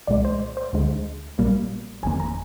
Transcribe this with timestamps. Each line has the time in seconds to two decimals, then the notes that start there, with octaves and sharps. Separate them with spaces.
0.07 C2 A#2 G#3 D5
0.25 C5
0.57 C5
0.73 D2 D3 G#3
1.38 A#1 A#2 G3 A#3
2.03 G1 F2 D#3 A#3 G#5
2.20 A#5